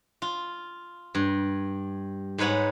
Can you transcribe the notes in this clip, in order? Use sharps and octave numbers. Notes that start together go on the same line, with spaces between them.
F4
G2
G#2 D#4 B4 C#5 F#5